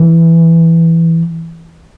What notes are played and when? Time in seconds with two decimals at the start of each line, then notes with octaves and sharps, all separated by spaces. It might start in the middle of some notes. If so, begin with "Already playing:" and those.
Already playing: E3